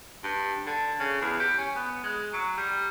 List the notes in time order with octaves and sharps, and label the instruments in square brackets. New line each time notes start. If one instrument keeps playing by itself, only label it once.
[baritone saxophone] G2
D3
C#3
E2
G4
C#4
B3
G#3
F#3
G3